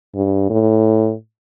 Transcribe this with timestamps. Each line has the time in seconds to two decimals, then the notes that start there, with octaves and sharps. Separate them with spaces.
0.15 G2
0.50 A2